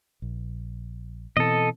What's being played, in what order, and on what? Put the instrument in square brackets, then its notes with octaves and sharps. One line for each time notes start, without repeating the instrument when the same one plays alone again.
[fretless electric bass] A#1
[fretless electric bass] B2 E3 C4 [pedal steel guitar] A4 D#5